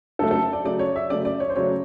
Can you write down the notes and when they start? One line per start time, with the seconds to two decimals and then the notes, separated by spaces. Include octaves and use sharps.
0.19 C#3 F#3 A3 A4
0.31 A4
0.53 D5
0.64 C#3 F#3 A3 D5
0.79 C#5
0.96 E5
1.10 C#3 F#3 A3 D5
1.25 D5
1.40 C#5
1.50 C5
1.56 C#3 F#3 A3 C#5